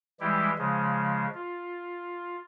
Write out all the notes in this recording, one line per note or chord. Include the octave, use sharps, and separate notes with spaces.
E3 G3 G#3 E4 G4
C#3 F3 G#3
F4